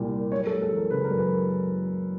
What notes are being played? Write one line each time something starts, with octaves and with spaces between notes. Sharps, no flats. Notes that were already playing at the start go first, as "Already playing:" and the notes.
Already playing: C2 A#2 G3
A#3
F#2 C#5
A4
G#3
A4
E3
A#4
C#3 B4
A#4
F#2
B4